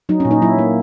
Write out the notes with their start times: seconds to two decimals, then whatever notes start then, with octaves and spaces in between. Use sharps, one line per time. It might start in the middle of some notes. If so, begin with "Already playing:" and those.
0.09 F#3 D#4
0.20 C#4
0.25 A#2
0.31 D#4
0.42 F#3 E4
0.58 A#3